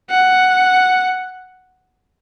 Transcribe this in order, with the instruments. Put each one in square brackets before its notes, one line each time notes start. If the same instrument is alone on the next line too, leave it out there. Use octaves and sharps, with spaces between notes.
[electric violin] F#5